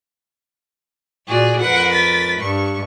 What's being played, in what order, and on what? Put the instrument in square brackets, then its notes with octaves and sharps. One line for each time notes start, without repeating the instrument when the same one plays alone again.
[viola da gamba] A#2 F#4 D5 [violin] G#4
[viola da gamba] F2 A#4 B4 [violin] F#5
[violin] A6 B6
[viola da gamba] G2 [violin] C#6